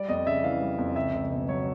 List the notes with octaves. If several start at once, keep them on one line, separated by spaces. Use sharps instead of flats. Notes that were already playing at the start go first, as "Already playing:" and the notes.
Already playing: G3 D5
F2 D#5
C#3 E5
E3 F5
G3
F2
C#2 E5
C#2
B2
F#3 C#5